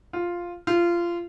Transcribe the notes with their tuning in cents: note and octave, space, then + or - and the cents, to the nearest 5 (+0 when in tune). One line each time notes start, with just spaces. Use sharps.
F4 +0
F4 -20